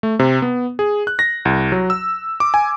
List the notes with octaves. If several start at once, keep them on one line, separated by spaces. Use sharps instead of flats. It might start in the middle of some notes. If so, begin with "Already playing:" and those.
A3
C3
B3
G#4
F#6
A#6
C2
F#3
E6
D6
G#5